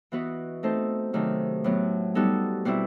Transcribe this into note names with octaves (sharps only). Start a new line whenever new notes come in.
E3 B3 F#4 B4 D#5
A3 C4 D#4 A4 C5
C3 D#3 F#3 A3
A2 F#3 B3
G3 B3 D#4 F#4 A4
B2 G3 C4 E4